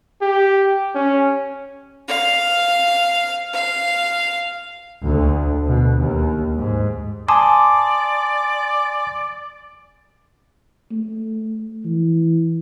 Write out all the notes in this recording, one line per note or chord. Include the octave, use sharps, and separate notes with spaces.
G4
C#4
F5
F5
D2
B2
D#2
G#2
D5 G#5 A5 C6 D6 D#6
A3
E3